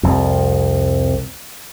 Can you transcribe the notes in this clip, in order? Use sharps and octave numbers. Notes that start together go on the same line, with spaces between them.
C2 F2